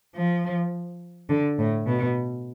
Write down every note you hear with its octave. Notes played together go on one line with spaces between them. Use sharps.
F3
D3
A2
B2